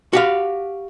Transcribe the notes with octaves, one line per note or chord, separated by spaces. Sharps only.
F#4 G4 F5